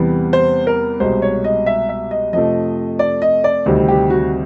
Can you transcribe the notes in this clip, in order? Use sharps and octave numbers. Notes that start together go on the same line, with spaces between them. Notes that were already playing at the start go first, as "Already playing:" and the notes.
Already playing: E2 C3 E3 G3 B3
C5
A#4
C2 B2 G#3 C5
C#5
D#5
E5
E5
D#5
F2 C3 F3 A3 D#5
D5
D#5
D5
D2 C3 D#3 G3 C4
G4
F#4